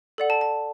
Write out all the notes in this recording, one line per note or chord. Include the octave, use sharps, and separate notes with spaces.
A4 D5 F#5
A5
A5